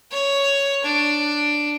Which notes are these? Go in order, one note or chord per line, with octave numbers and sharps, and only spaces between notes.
C#5
D4